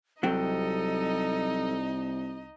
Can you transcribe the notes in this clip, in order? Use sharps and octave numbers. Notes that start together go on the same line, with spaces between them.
C2 F#3 C4 D#4 G4 A4 D#5